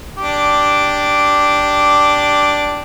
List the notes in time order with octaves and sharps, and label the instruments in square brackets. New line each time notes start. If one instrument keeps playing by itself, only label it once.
[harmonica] D4 G4